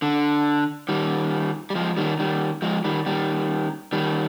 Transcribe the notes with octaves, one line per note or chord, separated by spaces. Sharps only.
D3
D#3 G3
G3
F3 G#3
D#3 G3
D#3 G3
F3 G#3
D#3 G3
D#3 G3
D#3 G3